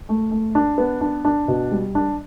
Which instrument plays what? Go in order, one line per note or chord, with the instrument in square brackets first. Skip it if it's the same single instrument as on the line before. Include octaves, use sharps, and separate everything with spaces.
[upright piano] A3
A3
D4
B3
D4
D4
B2
G3
D4